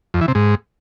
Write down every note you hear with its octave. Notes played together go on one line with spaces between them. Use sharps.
F2
E3
C3
G#2